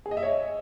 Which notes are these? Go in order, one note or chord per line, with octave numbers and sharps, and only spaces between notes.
G#4
D#5
E5
C#5
D#5